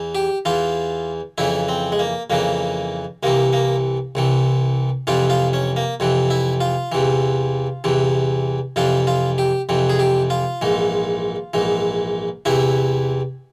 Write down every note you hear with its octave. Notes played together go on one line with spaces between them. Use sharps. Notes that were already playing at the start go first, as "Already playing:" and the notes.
Already playing: E2 E3
G4
E2 E3 F4
F2 C#3 E3 E4
C4
G#3
A#3
F2 C#3 E3 A#3
C2 C3 E3 A#3
A#3
C2 C3 E3
F2 C3 E3 F4
F4
C#4
A#3
F2 C3 E3
E4
F4
E2 C3 E3
E2 C3 E3
F2 C3 E3 F4
F4
G4
F2 C3 E3
G#4
G4
F4
A#1 G#2 E3
A#1 G#2 E3
E2 C3 E3 E4